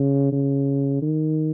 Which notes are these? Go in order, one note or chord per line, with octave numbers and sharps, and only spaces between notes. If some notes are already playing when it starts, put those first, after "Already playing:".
Already playing: C#3
C#3
D#3